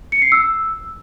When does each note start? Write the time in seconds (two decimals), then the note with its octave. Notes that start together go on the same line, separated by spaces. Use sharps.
0.12 C#7
0.22 C7
0.32 E6